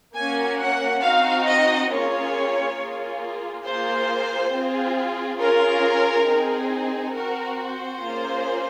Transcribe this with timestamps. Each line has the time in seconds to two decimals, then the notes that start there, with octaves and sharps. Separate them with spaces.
0.14 A#3 C#4 F#4 G#5
0.58 F#5
1.02 C4 D#4 F#4 F5
1.45 D#5
1.89 A#3 C#4 F4 G#4 C#5
2.77 A#3 F4 G#4
3.63 A#3 F4 G#4 C5
4.51 C4 F4 G#4
5.38 C#4 F4 G#4 A#4
6.26 C4 D#4 G#4
7.13 C4 F#4 A#4
7.57 C5
8.01 A#3 C#4 F4 G#4